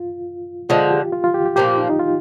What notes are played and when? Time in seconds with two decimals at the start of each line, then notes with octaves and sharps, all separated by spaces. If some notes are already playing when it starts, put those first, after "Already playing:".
Already playing: F4
0.69 D3 F3 G#3 F4
0.91 G4
1.12 F4
1.24 F4
1.34 G4
1.45 G4
1.56 A#2 F3 A#3 G4
1.67 F4
1.78 D#4
1.89 D#4
1.99 F4